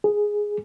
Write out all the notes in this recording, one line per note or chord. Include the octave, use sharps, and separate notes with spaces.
G#4